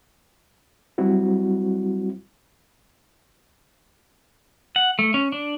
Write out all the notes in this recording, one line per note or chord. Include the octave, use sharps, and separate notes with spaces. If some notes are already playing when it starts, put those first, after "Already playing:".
F#3 G3 C4 E4 F#4
F#5
A3
C#4
D4